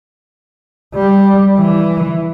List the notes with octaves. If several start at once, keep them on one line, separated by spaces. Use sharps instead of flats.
G3
E3